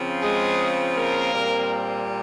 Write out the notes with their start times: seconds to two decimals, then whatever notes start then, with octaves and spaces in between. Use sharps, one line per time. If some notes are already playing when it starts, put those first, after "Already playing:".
Already playing: C#3 F3 C4
0.22 G#3 G#4
0.97 A#3 A#4
1.34 A#2 G3 C4